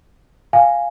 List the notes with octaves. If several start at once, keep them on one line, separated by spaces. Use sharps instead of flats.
F5 G#5